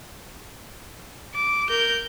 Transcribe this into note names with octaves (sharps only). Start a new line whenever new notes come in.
D6
A#4 G6